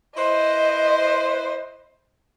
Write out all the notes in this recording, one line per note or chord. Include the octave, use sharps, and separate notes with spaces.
E4 B4 C5 D#5